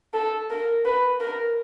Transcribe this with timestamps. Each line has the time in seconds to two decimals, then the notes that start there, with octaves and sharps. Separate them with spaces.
0.14 A4
0.50 A#4
0.85 B4
1.20 A#4